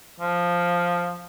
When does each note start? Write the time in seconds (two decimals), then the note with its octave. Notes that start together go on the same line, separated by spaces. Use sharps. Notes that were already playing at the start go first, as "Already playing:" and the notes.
0.19 F3